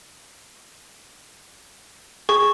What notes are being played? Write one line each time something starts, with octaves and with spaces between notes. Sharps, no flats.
G#4 C#6